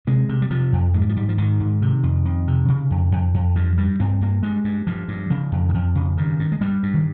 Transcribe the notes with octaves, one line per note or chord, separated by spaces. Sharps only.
C3 G#3
C3
G3
C3 F3
F2
G#2 G#3
G3
F3
G#2 G3
F3
G#2 D#3
G#2
C3
F2
F2
C3
C#3
F2
F2
F2
G2 F3
G2 G3
G2 C4
G2 A#3
G2 G#3
G2
G2 F3
G2
C#3 F3
F2
D#3
F2 F3
C#3
G2 D#3
G2
G#3
G2 G3
G2
D#3